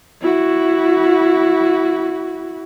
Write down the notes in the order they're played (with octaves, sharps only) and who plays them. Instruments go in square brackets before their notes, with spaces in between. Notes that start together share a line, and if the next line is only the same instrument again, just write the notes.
[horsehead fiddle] E4 F#4